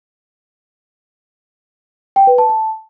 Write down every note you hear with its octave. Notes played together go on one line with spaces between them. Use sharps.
G5
B4
A5
A5